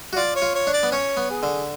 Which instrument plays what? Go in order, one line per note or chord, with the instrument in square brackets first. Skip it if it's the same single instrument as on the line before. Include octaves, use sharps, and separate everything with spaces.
[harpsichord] F#4
[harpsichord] F4 [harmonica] D5
[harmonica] C#5
[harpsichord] F4
[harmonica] C#5
[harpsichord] D4
[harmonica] D5
[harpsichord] B3
[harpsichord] C#4 [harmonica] C#5
[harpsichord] B3
[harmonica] G#4
[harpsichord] D3